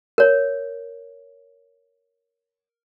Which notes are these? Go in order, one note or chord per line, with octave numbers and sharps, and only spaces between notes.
A#4 C#5